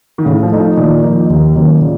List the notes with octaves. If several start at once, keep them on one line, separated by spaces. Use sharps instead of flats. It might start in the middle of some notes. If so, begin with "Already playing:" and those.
D#3
A2 C#3
F3
A3 D#4
F3
A#2 D#3
F3 A#3 D#4
D#2
D#3 F#3 A#3 C#4
A#2 C#3